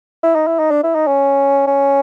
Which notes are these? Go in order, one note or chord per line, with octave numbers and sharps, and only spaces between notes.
E4
D#4
E4
D#4
D4
E4
D#4
C#4
C#4